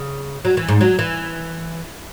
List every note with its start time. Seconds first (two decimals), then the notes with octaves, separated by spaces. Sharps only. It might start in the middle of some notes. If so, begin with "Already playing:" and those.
Already playing: C#3
0.45 F#3
0.57 E3
0.68 G#2
0.81 F#3
0.99 E3